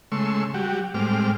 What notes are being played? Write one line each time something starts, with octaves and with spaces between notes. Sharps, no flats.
C#3 G#3 A3 C6 C#6 E6
F#3 G3 F#4 G4
A2 G3 G#3 C4 D6 F6